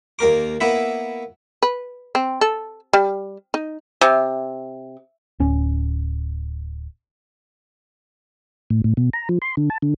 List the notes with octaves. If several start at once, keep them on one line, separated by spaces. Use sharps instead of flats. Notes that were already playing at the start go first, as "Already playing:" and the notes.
D#2 A#3 A#4 D6
A#3 B3 E4 E5
B4
C4
A4
G3
D#4
C3
D1 C#4
A2
A2
B2
A#5
F3
C6
D3
A5
D3